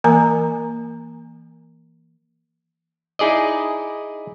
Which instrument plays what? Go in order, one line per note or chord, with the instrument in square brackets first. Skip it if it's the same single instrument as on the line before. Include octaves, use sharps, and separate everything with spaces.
[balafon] E3 A#3 A#4 G#5 A#5
[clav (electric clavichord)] D#4 E4 G#4 D5 D#5